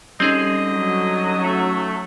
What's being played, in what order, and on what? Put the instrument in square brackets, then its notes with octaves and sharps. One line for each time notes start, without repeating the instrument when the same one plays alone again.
[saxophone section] D3 D#5 [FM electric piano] G3 C#4 D#4 [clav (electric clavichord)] C4 G#4
[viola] F#3 F#4
[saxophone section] A3